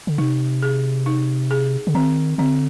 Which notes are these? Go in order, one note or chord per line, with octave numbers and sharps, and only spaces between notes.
D3
C3 D#4
G#4
D#4
G#4
D3
D#3 C4
D3 C4